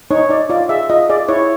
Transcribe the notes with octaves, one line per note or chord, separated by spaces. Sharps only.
D#4 C#5
D#4 D5
F4 D5
G#4 E5
F4 D#5
G#4 D5
E4 C#5